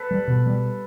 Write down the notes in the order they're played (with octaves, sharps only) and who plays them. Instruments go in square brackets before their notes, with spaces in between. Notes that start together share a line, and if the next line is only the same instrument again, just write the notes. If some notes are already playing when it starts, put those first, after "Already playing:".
Already playing: [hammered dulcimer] A4 B4
[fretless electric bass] G3
B2
G3